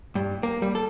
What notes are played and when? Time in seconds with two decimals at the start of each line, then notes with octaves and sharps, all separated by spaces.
0.15 G2
0.43 A#3
0.62 G3
0.75 A4